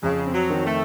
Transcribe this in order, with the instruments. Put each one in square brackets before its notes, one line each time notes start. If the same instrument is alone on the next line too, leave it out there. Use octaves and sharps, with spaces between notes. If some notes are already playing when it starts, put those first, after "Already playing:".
[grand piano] F2 [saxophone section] C#3
[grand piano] C4
[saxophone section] F#3
[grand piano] D#3
[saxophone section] A3